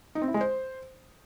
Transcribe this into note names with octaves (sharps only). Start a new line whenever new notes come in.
D#4
C4
E4
G#3
C5